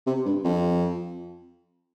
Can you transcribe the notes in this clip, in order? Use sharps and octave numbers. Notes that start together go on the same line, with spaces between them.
C3
G2
F2